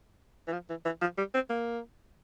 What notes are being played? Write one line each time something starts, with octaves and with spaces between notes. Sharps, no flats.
E3
F3
E3
E3
F3
G3
C4
A#3